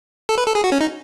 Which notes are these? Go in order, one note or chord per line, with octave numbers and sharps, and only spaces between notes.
A4
B4
A4
G#4
F#4
C#4
D#4